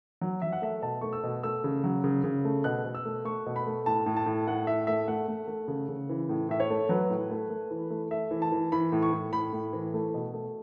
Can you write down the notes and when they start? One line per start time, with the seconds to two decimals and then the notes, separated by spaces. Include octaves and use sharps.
0.21 F#3
0.42 F#3 E5
0.52 F#5
0.62 A3 E5
0.82 B2 A5
1.01 A3 C#6
1.13 E6
1.23 B2
1.43 A3 E6
1.64 C#3
1.84 F#3
2.04 C#3
2.24 C#3
2.45 A3
2.64 B2 F#6
2.84 B2
2.95 E6
3.05 A3
3.25 A3 C#6
3.46 B2
3.56 B5
3.67 A3
3.86 A2 A5
4.06 A2
4.17 A5
4.26 A2
4.47 A3 F#5
4.67 A2 E5
4.87 A3 E5
5.08 A3 F#5
5.28 A3
5.48 A3
5.68 C#3
5.89 C#3
6.09 E3
6.29 A2
6.49 A2 E5
6.60 C#5
6.70 A3
6.89 F#3 B4
7.10 A2
7.30 A3
7.50 A3
7.71 E3
7.90 A3
8.11 A3 E5
8.31 E3
8.42 A5
8.52 E3
8.72 E3 B5
8.92 A2
9.03 C#6
9.13 A2
9.32 A2 B5
9.53 A2
9.73 E3
9.94 A3
10.14 B2
10.33 A3